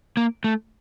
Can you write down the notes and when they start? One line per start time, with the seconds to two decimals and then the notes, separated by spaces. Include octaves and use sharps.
0.17 A#3
0.44 A3